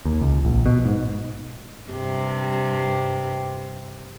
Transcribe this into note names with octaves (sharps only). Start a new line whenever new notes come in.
D#2
C#2
A#1
B2
G#2
G2 C3